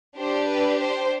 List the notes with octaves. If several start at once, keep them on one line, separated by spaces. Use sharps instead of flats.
D4 G4 C5
B4
C5